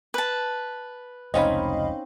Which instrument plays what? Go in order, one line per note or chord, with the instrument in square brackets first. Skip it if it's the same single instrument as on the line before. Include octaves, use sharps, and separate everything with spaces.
[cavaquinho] B4 A5
[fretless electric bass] F1 C#2 [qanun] C4 C#4 D#4 [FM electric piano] D#5 F5 B5